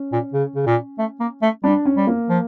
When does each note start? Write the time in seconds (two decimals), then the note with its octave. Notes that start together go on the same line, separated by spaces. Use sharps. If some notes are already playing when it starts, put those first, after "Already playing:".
Already playing: C#4
0.12 A#2
0.33 C#3
0.55 C#3
0.66 A#2
0.98 A3
1.20 A#3
1.42 A3
1.64 G3 D4
1.85 C#4
1.97 G3
2.07 A#3
2.29 F3